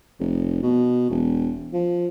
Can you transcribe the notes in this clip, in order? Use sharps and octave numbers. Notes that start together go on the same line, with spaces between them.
F1
B2
E1
F3